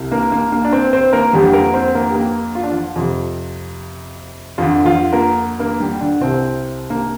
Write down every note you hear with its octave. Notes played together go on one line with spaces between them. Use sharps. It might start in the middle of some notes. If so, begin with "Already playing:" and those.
Already playing: C2 C3
A#3 A#4
A#3
A#3
D4
C4
C4 C5
A#3 A#4
F2 D3 G3 G4
A#3 A#4
C4 C5
A#3 A#4
G4
A#3 A#4
F4
D4
F3 F4
F2 C3
F2 D3 F3 F4
F3 F4
A#3 A#4
A#3 A#4
G3 G4
D3 D4
C2 C3 C4
A#3